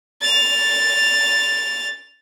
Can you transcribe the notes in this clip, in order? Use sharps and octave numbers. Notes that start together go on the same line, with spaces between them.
A6 F7